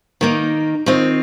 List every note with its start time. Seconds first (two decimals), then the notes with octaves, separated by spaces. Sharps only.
0.21 D#3 A#3 D#4
0.86 D#3 C4 F4 D#5